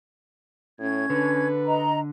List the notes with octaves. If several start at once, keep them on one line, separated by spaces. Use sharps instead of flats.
A2 C#4 G#6
D3 B4
D#5 A#5